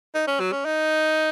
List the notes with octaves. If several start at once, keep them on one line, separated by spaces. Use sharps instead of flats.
D#4
C#4
F#3
C#4
D#4